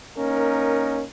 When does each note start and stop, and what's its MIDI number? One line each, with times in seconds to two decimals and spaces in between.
0.18 1.03 58
0.18 1.03 61
0.18 1.03 63
0.18 1.03 70